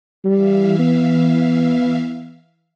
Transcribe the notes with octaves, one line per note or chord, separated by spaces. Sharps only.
E3 G3 E5 F5
B3